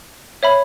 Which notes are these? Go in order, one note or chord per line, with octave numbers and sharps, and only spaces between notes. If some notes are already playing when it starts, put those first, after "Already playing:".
C#5 E5 B5